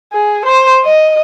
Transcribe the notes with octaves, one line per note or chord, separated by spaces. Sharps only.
G#4
C5
D#5